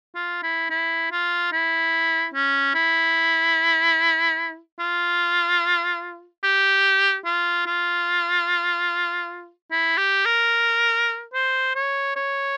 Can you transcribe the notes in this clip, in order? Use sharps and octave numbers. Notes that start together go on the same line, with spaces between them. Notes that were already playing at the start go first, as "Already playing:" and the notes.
F4
E4
E4
F4
E4
C#4
E4
F4
G4
F4
F4
E4
G4
A#4
C5
C#5
C#5